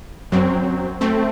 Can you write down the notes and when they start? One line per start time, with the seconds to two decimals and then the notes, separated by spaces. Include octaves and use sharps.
0.32 F#2 F#3 C4
1.01 A3 C4